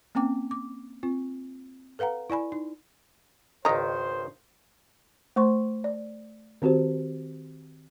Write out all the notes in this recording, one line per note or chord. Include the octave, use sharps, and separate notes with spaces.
A#3 C4 C#4 G5 D6
D6
C4 F4
A4 B4 F5 F#5 A#5
E4 D5 G#5 B5
D#4
G#1 C#2 D#3 C5 D#5 A#5
A3 C5 C6 C#6
D5
D#3 C4 F#4 G4 C5